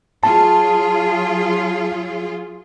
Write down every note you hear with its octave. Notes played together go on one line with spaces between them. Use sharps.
F#3 F4 G#4 A5